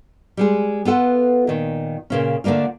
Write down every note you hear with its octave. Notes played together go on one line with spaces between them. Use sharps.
G3 G#3 G#4
B3 F4 A4 F#5
A#2 D#3
A#2 C#3 C#4
D3 A3 A#3 D4 F4